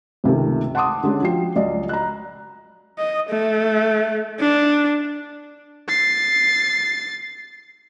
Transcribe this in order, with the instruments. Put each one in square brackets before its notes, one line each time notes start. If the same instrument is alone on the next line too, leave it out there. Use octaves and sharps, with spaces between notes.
[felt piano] C#2 C3 D#3 A3
F#5 A5 C6 D6 D#6
D3 G#3 C#4
F3 F#4 G5 C7
C#2 F#3 D5 D#5
A#5 F#6
[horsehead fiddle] D#5
A3
D4
[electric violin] A6 C7